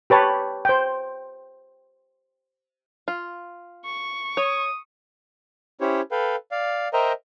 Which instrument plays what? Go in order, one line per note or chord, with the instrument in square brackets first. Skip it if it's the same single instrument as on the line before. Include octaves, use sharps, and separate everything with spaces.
[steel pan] G4 B4 C#5 A5
C5 G5
[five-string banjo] F4
[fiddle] C#6
[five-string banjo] C#5 [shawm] D#6
[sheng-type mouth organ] C#4 E4 G4 C5 C#5
A4 B4 F5 G5
D5 F5
A#4 C5 D#5 E5 G5 A#5